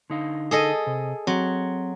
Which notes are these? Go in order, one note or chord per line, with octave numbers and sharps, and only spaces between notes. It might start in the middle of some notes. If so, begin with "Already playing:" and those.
D3 D#4 F5
G#4 A4 D#5
C3
F#3 C4